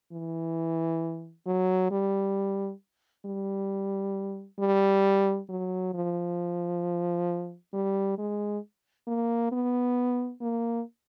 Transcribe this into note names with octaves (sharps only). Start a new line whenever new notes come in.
E3
F#3
G3
G3
G3
F#3
F3
G3
G#3
A#3
B3
A#3